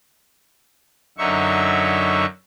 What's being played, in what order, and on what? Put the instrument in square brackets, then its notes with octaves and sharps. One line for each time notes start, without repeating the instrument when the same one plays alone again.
[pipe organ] F#2 D3 F#3 D#4 E5 C#6